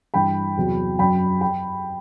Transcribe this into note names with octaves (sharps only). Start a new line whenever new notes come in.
G2 E3 G5 B5
E2 C3 F#3
F#2 F#3 G5 B5
G5 B5